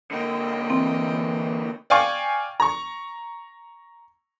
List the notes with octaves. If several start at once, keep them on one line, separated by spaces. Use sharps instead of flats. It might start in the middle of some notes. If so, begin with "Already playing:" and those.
D3 A#3 D#5 G5
E3 C4
D5 F5 G5 G#5 C#6
A#5 C#6